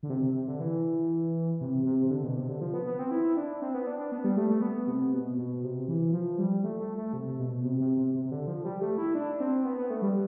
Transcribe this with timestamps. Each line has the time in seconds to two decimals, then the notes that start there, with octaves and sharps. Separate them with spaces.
0.03 D3
0.10 C3
0.23 C3
0.35 C3
0.48 D3
0.60 E3
1.61 C3
1.85 C3
2.06 C3
2.11 D3
2.23 B2
2.36 C3
2.49 D3
2.61 F3
2.74 B3
2.86 B3
2.99 C4
3.11 E4
3.37 D4
3.62 C4
3.74 B3
3.87 D4
3.99 D4
4.12 B3
4.24 G3
4.37 A3
4.50 A3
4.62 B3
4.87 C3
5.13 B2
5.38 B2
5.63 C3
5.88 E3
6.13 F3
6.38 G3
6.64 A3
6.80 A3
6.97 A3
7.13 C3
7.39 B2
7.63 C3
7.80 C3
7.97 C3
8.15 C3
8.25 C3
8.31 D3
8.47 F3
8.65 G3
8.81 A3
8.98 E4
9.15 D4
9.40 C4
9.65 B3
9.77 B3
9.90 A3
10.02 G3